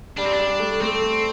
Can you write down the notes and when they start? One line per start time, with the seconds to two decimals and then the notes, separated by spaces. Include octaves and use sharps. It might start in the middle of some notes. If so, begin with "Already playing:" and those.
0.17 G3 D4
0.26 C4
0.33 D4
0.39 G3
0.60 A3
0.81 A3 C4